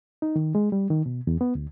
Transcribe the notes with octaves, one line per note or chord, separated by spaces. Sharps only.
D#4
D#3
G#3
G3
D#3
B2
E2
B3
D2